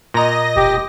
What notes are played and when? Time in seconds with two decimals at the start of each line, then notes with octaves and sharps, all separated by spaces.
0.14 A#2 D#5 A#5 A#6
0.56 E1 G4